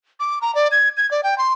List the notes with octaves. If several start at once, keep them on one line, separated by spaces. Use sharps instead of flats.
D6
A#5
D5
G#6
G#6
D5
G5
C6